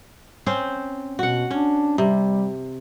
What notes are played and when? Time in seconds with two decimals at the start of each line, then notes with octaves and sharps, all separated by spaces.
0.46 C4 C#4 C5
1.19 B2 F#4 F#5
1.51 C#4 D4
1.98 C3 G3